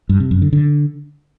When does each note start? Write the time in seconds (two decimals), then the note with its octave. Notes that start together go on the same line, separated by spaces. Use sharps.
0.09 G2
0.20 C3
0.31 F#2
0.42 D3
0.53 D3